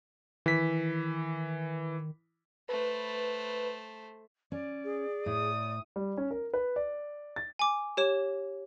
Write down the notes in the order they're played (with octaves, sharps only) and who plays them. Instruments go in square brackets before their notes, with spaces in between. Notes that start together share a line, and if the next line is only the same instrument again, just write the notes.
[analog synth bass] D#3 [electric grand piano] E3 B6
[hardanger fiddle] A3 C5 [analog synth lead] B4
[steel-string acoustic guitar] C#4 [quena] D5
[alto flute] G#4
[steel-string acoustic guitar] A2 [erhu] D#6
[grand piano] G3
C#4
A#4
B4
D5
A6
[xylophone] G#5 D6
G4 C#5 E7